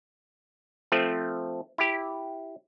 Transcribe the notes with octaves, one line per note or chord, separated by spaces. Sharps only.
F3 A3 C4
E4 G4